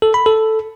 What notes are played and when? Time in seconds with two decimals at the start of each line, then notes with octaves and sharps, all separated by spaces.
0.02 A4
0.14 B5
0.26 A4